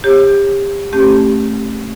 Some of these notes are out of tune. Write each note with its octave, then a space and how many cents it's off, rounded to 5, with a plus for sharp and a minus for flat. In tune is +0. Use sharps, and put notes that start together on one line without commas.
G4 +25 C#5 -40
A3 +0 C#4 -35 G4 +0